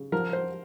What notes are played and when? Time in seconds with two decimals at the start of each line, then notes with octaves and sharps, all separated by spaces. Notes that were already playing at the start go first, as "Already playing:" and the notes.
Already playing: C#3
0.12 F3 A#4
0.33 C5